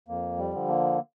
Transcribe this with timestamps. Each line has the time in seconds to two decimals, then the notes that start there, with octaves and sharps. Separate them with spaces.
0.08 F2 A#3
0.38 G3
0.54 D3 F3
0.69 A#3